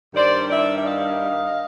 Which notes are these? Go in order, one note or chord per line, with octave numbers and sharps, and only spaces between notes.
G2 D#3 G3 C5 D5
D5 E5
E5
D#5 F5